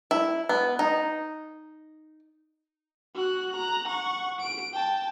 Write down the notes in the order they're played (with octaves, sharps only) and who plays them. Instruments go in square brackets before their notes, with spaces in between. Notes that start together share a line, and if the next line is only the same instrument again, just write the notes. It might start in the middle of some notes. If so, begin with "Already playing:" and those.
[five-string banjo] E4
B3
D#4
[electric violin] F#4 F#6
A#5 F#6
F#5 C#6
D7
G5 A5